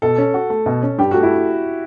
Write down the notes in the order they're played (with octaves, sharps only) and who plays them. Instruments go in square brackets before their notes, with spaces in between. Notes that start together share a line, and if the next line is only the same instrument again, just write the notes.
[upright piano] B2 [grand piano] A4
[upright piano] C#4
F#4
A3
B2
C#4
[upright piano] G2 [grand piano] G4
[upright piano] A3 [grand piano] F#4
[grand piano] E4